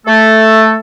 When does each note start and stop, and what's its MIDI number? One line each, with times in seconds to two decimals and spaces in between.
0.06 0.75 57
0.06 0.75 69